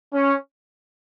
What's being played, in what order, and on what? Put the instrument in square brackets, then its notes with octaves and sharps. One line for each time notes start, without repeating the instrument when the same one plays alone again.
[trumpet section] C#4